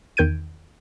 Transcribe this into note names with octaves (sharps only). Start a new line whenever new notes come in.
E2 D#3 G6 G#6 D7 D#7